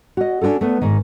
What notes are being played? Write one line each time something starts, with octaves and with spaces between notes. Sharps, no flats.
F#4 D#5
C#4 D4 F4 F#4 A4
A3 B3 B4
G#2 D#3